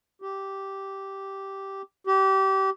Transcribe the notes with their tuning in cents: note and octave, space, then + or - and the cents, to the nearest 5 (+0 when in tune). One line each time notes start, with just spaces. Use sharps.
G4 -10
G4 -25